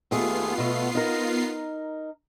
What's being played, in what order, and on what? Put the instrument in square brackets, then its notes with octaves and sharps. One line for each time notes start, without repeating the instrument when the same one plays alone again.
[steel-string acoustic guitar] D#2 A3 G#4 [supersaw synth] B3 F4 C7
[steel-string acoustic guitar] B2 A3
D#4 A#4